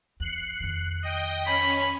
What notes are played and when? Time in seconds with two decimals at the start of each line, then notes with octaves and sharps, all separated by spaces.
0.20 E2 F#6 C7 C#7
0.60 F2 D#3
1.03 D#5 G5
1.46 C#4 B5